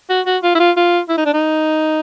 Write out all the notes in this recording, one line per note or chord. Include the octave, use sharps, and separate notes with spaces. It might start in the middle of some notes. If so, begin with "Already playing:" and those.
F#4
F#4
F4
E4
F4
F4
E4
D#4
D4
D#4